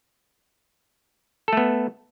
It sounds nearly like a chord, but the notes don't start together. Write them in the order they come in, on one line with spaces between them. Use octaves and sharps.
A4 A3 B3